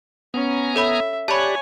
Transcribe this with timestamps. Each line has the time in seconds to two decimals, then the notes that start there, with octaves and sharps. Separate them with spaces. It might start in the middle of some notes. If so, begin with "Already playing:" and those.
0.34 B3 C#4 G#5 A#5
0.76 A4 C#5 E5 B5
1.28 G4 C#5 D5 G#5 A5 B5 F#6